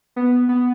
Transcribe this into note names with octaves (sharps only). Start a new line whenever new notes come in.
B3
B3